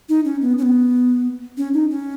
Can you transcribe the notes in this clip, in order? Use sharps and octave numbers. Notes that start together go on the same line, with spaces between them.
D#4
C#4
B3
C#4
B3
C#4
D#4
C#4